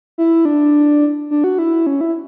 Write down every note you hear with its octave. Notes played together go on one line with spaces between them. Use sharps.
E4
D4
D4
F#4
E4
C#4
E4